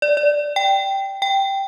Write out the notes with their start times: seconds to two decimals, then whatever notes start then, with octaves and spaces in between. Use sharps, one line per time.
0.02 D5
0.17 D5
0.56 G5
1.22 G5